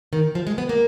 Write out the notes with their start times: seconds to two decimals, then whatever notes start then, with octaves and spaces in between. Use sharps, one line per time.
0.13 D#3
0.35 F3
0.47 G#3
0.58 B3
0.69 A#3